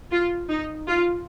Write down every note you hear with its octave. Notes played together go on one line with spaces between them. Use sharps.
F4
D#4
F4